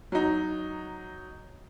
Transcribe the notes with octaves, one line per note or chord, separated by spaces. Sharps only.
F#3 D#4